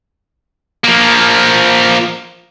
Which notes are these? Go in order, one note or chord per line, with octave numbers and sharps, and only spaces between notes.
F3 A#3